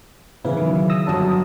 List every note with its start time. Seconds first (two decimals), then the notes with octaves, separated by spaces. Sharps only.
0.45 C#3 E3 B3 E4 B4
0.57 D#3 F#3
0.90 D#6 E6 A#6
1.07 G1 F#3 A5 D#6